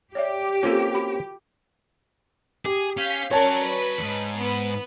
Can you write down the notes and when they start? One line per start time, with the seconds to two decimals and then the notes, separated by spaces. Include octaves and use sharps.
0.15 G4 C#5 D5 E5
0.63 A#3 C4 C#4 F4 A4
0.94 F#4 B5
2.65 G4 G#4
2.97 C#4 F5 G6 B6
3.31 C#4 F#4 A#4 C#5 D5 A5 A#5
3.64 B4
3.98 E2 G#2
4.38 B3 B4